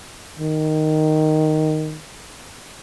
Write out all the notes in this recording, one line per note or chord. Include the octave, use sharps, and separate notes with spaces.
D#3